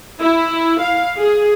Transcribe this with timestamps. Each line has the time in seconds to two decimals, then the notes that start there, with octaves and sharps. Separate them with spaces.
0.20 E4
0.80 F5
1.18 G#4